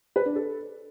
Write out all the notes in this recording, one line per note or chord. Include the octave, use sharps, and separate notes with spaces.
B4
D4
A4